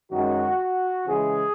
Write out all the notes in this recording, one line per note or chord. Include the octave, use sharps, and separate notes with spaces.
F#2 D#3 G#3 F#4
C#3 E3 G#3 G#4